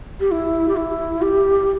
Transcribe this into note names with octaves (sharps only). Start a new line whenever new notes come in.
G4
E4
G4
E4
G4